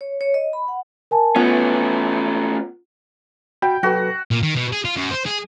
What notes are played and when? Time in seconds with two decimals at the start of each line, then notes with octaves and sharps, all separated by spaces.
0.01 C#5
0.21 C#5
0.34 D#5
0.53 B5
0.68 F#5
1.11 A#4 G#5 A5
1.36 A3 B3 C#4 F4
3.62 F#4 G5 B5
3.83 F#3 F#4 A4 B4
4.31 A#2
4.43 D#3
4.55 B2
4.73 G#4
4.85 F4
4.97 F#2
5.11 C5
5.26 G#4